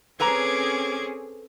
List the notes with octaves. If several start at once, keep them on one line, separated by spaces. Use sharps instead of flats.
C4 C#4 G#4 A4 B4 A#5 D6 G#6